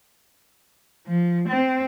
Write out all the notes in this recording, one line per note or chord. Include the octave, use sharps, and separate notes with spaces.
F3
C4